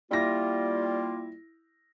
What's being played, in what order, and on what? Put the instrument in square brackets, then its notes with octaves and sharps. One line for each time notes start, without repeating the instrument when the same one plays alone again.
[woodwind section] G3 A#3 F4 [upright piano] E4 A#6